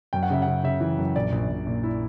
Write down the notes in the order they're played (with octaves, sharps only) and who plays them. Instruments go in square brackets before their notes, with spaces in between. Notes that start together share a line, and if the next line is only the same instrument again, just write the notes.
[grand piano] F#2 G5
F#5
C#3 E5
C#3 F#5
C#3 E5
E3
F#2
A#1 D5
A#1
A#1
A#2
E4